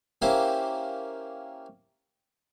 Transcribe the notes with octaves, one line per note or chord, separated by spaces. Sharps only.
A#3 C#4 E4 G4 C5